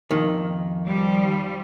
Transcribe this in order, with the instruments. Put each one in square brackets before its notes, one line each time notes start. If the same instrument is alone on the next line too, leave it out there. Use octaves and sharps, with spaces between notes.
[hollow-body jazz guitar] F2 D#3
[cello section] F3 G3